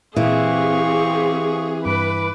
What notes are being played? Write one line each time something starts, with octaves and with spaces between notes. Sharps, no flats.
A#2 E3 C4 G4 G#4 F5 C#6
G2 B4 D6